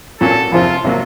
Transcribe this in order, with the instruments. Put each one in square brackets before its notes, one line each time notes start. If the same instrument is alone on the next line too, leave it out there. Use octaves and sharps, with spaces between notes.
[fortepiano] A#2 F#3 A#3 C#4 [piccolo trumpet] A4
[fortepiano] F2 C3 F3 C4 [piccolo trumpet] F4
[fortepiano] C3 F#3 A#3